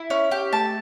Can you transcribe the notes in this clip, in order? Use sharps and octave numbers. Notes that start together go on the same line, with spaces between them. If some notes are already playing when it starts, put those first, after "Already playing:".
Already playing: E4
C#4
G4
A3 A5